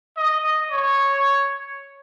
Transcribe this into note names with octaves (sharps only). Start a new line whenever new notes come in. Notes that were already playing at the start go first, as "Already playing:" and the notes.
D#5
C#5